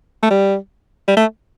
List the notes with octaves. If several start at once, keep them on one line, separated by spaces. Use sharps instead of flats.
A3
G3
G3
A3